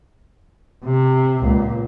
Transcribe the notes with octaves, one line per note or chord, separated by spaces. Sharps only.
C3
C#2 A#2